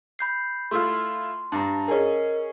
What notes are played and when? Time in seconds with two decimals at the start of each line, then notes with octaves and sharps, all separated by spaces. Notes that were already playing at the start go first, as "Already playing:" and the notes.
0.19 B5 G6 C7
0.71 A3 E4 F4 C6
1.52 G2 A5 A#5
1.88 C#4 G#4 A#4 D#5